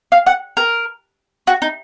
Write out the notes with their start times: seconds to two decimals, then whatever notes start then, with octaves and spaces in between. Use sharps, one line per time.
0.12 F5
0.27 F#5
0.57 A#4
1.47 F#4
1.62 D#4